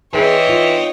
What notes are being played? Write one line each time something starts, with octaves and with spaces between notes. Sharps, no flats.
E3 C4 G#4 C5 C#5 D#5 G5
D#4 F4